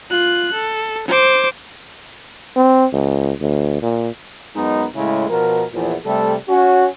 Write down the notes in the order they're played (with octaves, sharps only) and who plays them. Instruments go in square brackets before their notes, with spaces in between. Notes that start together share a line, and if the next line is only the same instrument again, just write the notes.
[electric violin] F4 F#6
A4
C5 D6
[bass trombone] C4
C#2
D2
A#2
[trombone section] F#2 G#3 B3 D#4
A2 C#3 G#3 E4
B2 F3 A#4
E2 A#2 E3 F3
C3 G3 A3 A4
C#4 F#4